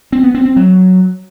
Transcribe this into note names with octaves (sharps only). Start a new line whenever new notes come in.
C4
B3
C4
C4
F#3